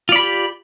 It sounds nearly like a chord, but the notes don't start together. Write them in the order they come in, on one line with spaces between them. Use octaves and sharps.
F4 D5 B5 G4